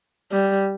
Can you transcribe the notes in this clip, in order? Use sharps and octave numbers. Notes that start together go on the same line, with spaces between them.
G3